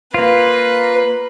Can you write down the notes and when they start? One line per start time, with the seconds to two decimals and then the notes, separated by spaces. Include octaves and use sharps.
0.14 A#3 F4 B4